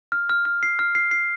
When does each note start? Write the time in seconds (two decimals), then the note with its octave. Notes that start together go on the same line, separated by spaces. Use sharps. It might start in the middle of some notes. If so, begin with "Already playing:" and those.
0.12 F6
0.30 F6
0.45 F6
0.63 C7
0.79 F6
0.95 C7
1.11 C7